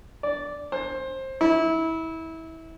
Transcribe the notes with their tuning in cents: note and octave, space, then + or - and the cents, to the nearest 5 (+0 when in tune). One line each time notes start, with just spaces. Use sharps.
D5 -10
C5 +20
E4 -25